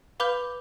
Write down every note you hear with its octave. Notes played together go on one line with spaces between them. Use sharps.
B4 F5 B5 D6 G6